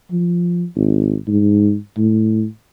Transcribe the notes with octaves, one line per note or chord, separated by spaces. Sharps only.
F3
G#1
G#2
A2